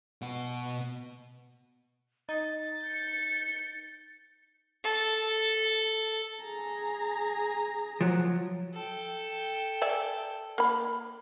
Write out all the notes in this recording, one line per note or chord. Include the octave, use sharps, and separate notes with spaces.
B2 F#5
D#4 A6
G6 C#7
A4
G#4 A#5
F3 F#3
A4 G5
D5 E5 G#5
A#3 B5